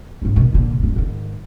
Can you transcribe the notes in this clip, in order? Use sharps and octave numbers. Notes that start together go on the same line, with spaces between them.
G#2 F3
B2 D#3
A#2 D3
D1 G2
G#2 D#3